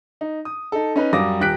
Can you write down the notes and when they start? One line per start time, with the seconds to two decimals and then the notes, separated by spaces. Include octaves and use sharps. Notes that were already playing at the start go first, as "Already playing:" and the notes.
0.21 D#4
0.45 D#6
0.72 D#4 A4
0.96 C#4 D#4 B4
1.13 F#2 G3 F5 D6 D#6 A#6
1.40 D#1 G4 F#6 B6 D7